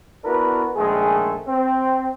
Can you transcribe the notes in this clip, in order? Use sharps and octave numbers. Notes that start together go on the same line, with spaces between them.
B3 D4 E4 F#4 A#4 B4
A#1 D#3 G#3 A3 G#4
C4